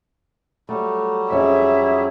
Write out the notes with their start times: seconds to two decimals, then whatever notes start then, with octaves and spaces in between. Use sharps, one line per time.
0.69 F#3 G3 A3
1.31 F2 C#4 G#4 E5